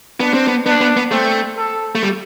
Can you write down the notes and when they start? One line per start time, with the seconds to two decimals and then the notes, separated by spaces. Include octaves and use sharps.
0.20 B3 D4
0.34 C4
0.48 B3
0.66 B3 D4
0.81 B3
0.97 B3
1.11 A3 C4
1.58 A4
1.95 A3
2.03 G3